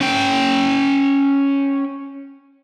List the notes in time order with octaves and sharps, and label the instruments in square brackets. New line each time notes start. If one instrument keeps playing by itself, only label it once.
[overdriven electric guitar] C#4 G5